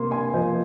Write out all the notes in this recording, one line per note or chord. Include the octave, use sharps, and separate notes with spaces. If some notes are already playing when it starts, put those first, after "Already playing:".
Already playing: C3 A#3 C6
G#5 C6
F3 C5 D#5